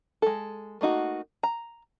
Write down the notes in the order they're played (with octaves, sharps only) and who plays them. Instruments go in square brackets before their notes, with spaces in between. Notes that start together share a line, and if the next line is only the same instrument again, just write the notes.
[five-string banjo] G#3 A4
A3 A#3 D#4 F#4
A#5